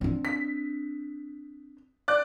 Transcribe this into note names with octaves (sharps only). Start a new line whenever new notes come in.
C4 D4
B6
D5 F#6